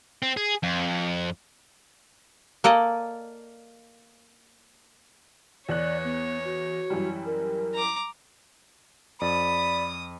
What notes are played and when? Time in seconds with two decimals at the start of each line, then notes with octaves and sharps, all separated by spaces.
0.22 C4
0.37 G#4
0.63 F2
2.64 A#3 A4 D5 D#5
5.69 E2 C#5 D5 F#6
6.04 B3
6.45 F#4
6.90 F#2 E3 G3
7.26 A#4
7.74 A#5 D6
9.21 F2 D5 B5 D#6